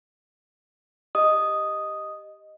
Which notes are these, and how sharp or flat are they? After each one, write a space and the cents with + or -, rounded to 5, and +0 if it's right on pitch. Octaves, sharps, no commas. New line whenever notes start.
G4 +0 D#5 +0 D#6 +0